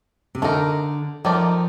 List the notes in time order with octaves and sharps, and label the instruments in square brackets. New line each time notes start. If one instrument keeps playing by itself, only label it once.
[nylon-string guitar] C3
[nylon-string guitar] D3 [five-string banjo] A3 D#4 A#4
[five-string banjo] D#3 A3 D#4 A#4 D5 [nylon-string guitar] F3